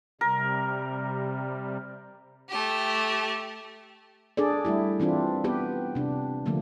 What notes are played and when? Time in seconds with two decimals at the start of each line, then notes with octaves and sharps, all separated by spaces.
0.21 C3 G3 A#4
2.49 A3 G4
4.37 D4 G#4 A4 D5
4.65 G3 A3 E4 G4
5.00 E3 C4 D4 F4
5.44 B3 G4 B4
5.95 C3 D4
6.46 D3 F3 A3 A#3